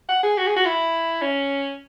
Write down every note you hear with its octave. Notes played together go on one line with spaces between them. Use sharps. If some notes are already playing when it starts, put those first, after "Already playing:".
F#5
G#4
F#4
G#4
F#4
E4
C#4